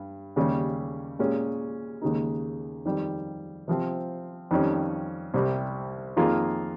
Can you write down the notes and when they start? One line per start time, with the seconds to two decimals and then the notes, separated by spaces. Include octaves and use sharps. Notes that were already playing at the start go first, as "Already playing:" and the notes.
Already playing: G2
0.36 D#2 C#3 G3 C#4
1.19 A#2 G#3 C#4 G4
2.02 D#2 C#3 G#3 D#4
2.85 F2 D#3 G3
3.68 C3 F3 C4
4.51 F2 D#3 G3 C#4
5.34 C2 C3 G3
6.17 F2 D#3 A#3 F4 G#4